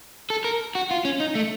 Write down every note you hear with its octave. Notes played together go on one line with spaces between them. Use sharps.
A4
A#4
F#4
F4
C#4
D#4
A3